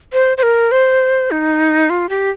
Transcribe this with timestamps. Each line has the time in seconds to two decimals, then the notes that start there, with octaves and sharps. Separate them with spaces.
0.13 C5
0.38 C5
0.43 A#4
0.72 C5
1.31 D#4
1.90 F4
2.09 G4